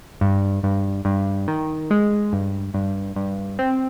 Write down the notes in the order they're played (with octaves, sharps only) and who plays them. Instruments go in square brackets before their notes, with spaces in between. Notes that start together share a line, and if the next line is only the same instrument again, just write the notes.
[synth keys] G2
G2
G2
D#3
G#3
G2
G2
G2
C4